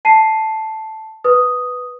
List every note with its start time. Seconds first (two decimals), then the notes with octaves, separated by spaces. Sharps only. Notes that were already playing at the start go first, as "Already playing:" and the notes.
0.05 A5 C7 D#7
1.24 B4 D#6